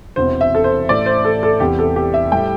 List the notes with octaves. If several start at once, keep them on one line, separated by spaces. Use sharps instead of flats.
E1 E2 C3 C5
E5
A4
C5
A1 A2 A3 D5
C5
A4
A4
E2 C3 E3 G4
A4
G4
E5
A2 G3 E4 G5